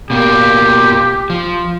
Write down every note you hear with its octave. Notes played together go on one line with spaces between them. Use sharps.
B2 A#3 G4
F3